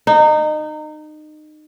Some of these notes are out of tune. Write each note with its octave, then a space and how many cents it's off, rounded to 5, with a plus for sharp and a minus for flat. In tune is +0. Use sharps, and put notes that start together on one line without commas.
D#4 -25